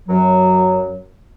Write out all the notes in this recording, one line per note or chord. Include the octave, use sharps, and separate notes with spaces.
F#2 F#3